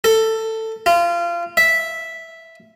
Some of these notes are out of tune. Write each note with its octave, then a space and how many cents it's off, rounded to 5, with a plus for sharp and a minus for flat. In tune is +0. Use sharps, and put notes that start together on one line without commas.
A4 +15
F4 -25
E5 -5